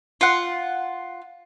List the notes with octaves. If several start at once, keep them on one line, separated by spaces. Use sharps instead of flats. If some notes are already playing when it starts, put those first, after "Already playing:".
F4 F#5